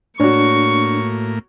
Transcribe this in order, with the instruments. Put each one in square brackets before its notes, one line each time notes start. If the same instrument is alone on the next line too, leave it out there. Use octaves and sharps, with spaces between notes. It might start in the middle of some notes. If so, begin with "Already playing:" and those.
[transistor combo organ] A2 A#3 [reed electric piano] D4 [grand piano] F#4 C#5 [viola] C#6